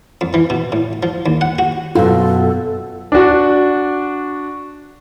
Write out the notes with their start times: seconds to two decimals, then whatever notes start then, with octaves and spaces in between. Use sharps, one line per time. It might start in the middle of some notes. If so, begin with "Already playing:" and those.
0.21 F2
0.34 E3
0.50 B2
0.72 A2
1.03 F3
1.26 D#2
1.41 F#5
1.59 F#4
1.95 F#2 B2 F4 A4
3.12 D4 F#4